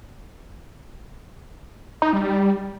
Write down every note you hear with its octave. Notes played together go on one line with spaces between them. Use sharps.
D#4
G3
G3